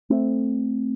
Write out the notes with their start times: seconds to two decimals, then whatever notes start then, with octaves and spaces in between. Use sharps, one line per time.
0.10 A3 C4